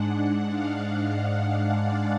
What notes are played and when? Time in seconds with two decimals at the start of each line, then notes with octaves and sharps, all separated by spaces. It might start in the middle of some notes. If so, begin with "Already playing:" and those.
Already playing: G#2 G#3 D4 F#5
0.16 F#5
0.49 F5
1.79 D5